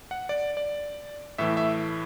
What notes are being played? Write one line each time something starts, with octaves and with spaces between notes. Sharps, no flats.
F#5
D5
D5
A2 E3 A3 E5
E5